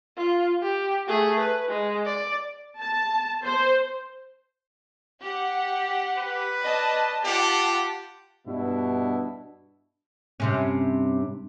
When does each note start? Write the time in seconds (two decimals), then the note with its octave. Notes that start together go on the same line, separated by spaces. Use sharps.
0.17 F4
0.62 G4
1.08 A3 G#4
1.39 B4
1.69 G#3
2.05 D5
2.79 A5
3.44 C5
5.23 G4 F#5
6.18 B4
6.63 D5 D#5 A5
7.24 F4 G4 F#5 A5
8.48 G2 B2 D4 E4
10.40 G2 C3 C#4